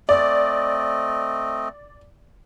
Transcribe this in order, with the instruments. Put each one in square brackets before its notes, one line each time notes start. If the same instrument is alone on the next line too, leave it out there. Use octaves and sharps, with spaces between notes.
[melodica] A3 C4 D#5 [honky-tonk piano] D5